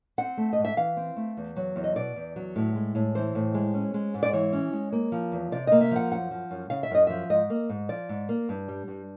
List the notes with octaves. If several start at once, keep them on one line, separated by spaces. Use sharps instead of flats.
C4 F#5
A3
D#5
G#2
E5
E3 F5
C4
A3
E2
F#3
E2
D#5
B2 D5
E2
F#3
A2
G#3
A2
E3 C5
A2
G#3
C#4
G#3
G#2
D5
E3 C#5
C#4
G#3
A#3
F3
E2
C3 D5
A#3 D#5
E5
F3 F#5
F#2 F#5
F3
F#2
C#3 F5
E5
F#2 D#5
F3 E5
G#2 D#5
A#3
G#2
F3 D5
G#2
A#3
G2
G3
G2